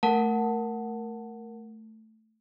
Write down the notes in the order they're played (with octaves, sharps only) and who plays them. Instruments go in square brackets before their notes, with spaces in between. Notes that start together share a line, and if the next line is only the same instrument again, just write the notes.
[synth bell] A3 [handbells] A#4 F#5 A5